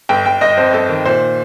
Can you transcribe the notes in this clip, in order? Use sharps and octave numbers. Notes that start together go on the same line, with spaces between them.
G1 G5
G1 G5
G1 D#5
F2 C5
G1 A4
D#3
A#2 C5